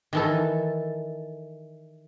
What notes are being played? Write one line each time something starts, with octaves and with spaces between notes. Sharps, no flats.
D#3 E3 A4